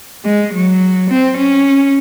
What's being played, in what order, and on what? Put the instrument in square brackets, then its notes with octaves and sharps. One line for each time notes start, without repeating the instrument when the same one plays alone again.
[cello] G#3
F#3
C4
C#4